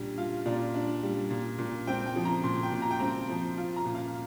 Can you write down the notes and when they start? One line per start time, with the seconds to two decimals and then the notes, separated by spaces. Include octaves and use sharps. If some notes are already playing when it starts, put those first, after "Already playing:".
Already playing: A#2 G3 D4
0.18 F4 F5
0.46 A#2 D5
0.74 D4
1.03 G3
1.30 A#2
1.59 A#2
1.87 C4 G5
2.06 G5
2.16 F3
2.25 A#5
2.43 A#2 C6
2.63 G5
2.72 A#2
2.82 A#5
2.91 G5
2.99 C4 A#5
3.29 F3
3.57 F4
3.76 A#5
3.85 A#2
3.95 F5